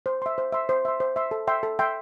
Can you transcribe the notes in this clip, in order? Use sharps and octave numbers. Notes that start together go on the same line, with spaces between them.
C5
E5 C6
C5
E5 C6
C5
E5 C6
C5
E5 C6
A4
E5 G5 C6
A4
E5 G5 C6